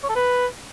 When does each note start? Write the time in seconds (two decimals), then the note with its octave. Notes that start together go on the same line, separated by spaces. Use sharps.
0.04 C#5
0.10 A4
0.16 B4